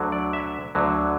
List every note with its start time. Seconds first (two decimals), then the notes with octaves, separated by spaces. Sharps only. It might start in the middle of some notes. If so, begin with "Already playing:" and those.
Already playing: D2 D3 F#3
0.12 D5
0.33 E5
0.75 D2 D3 F#3